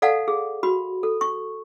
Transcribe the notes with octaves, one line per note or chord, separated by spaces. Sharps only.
A4 D5 F5 F#5 A5
G#4
F#4 B5
A4
C#6